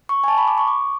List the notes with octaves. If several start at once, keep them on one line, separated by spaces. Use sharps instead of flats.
C#6
G#5
A5
B5
D6
C#6
D6